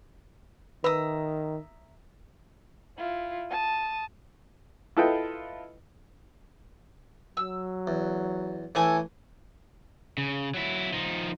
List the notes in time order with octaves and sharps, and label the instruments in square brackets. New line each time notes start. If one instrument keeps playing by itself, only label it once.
[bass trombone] D#3 [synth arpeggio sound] B4 [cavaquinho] E5 A#5 D#6
[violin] E4 F4
A5 D#6
[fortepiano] E4 F4 A4 B4 D#5 G5
[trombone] F#3 [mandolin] E6
[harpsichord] E2
[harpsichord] A2 E3 A3 [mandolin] A4 G#5
[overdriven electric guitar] C#3
F#3 E4
F3 D#4